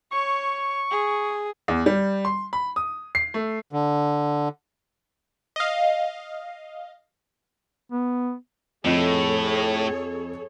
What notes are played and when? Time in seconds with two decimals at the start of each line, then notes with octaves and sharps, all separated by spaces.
0.12 C#5 C#6
0.91 G#4
1.68 E2
1.86 G3
2.25 C6
2.53 B5
2.76 D#6
3.15 C7
3.34 A3
3.72 D3
5.56 D#5 F5
7.92 B3
8.85 F2 A2 G#4 A4 C#5 D#5 C#7